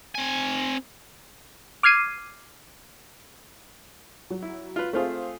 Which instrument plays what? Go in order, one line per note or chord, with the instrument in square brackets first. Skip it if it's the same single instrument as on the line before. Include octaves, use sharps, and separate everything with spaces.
[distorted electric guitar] C4 G#5
[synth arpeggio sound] D6 F6 G#6 C7 D#7
[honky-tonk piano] F#3
[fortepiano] E4
F4 B4
[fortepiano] A3 F4 G#4 [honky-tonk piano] C4 C5 F5